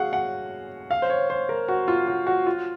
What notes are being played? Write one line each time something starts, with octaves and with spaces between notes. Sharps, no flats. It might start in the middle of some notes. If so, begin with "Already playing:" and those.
Already playing: F#4 G#4 F5 F#5
F#5
F5
C5
C#5
C5
A#4
F#4
F4
F#4
F#4
F4